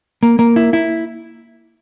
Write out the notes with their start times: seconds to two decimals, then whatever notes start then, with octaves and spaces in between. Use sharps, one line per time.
0.23 A#3
0.39 A#3
0.56 E4
0.73 E4